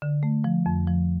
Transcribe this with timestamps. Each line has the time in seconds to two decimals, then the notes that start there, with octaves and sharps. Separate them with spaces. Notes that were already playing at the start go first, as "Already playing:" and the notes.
0.02 D3
0.23 A3
0.44 F3
0.66 F2
0.87 F3